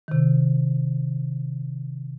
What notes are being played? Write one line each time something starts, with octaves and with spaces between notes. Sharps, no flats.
C3 D#3